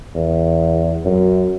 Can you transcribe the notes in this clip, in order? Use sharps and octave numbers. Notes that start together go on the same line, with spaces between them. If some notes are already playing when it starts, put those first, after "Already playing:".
E2
F#2